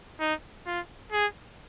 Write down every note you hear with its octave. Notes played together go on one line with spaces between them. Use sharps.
D#4
F4
G#4